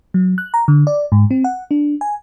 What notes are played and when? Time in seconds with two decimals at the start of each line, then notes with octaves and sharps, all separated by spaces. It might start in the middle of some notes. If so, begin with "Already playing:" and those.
0.14 F#3
0.38 F#6
0.54 A#5
0.68 D3
0.87 D5
1.12 G#2
1.31 C4
1.44 F#5
1.71 D4
2.01 G#5